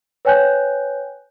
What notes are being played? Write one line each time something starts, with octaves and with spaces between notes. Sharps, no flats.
B4 C#5 G5 G#5 F#6 G6